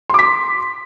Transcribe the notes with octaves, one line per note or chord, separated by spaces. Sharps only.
C6 D6 B6